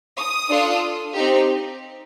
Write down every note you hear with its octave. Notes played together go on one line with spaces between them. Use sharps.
D#6
D4 F4 A4
C4 D#4 G4